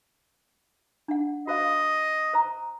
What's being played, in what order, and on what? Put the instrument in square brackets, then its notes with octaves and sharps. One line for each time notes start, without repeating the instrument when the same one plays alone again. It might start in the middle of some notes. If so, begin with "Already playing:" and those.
[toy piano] D4 F#5
[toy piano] F#4 C5 F5 [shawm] D#5
[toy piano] C5 A#5